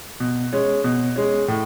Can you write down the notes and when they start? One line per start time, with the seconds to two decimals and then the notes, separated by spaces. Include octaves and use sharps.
0.20 B2
0.53 G#3 C#4
0.84 B2
1.16 G#3 C#4
1.48 A2